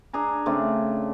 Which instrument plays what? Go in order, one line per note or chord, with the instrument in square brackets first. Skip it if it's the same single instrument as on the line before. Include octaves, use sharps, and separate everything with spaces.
[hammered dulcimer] D4 G#4 G#5 A#5
C#3 A3 C4 D4